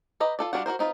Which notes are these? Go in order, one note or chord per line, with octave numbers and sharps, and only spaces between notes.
G4 B4 D#5 A#5
F4 A4 D5
G3 D4 F4 F#4 F#5
F#4 G#4 A#4 C5
C4 D#4 F4 B4